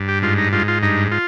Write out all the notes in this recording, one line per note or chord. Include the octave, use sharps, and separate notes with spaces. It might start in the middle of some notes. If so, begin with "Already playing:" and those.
Already playing: G2
G4
G#2 F4
D#4
G#2 F4
F4
G2 D#4
F4